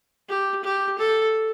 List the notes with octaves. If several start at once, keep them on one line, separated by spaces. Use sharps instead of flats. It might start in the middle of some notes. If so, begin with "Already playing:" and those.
G4
G4
A4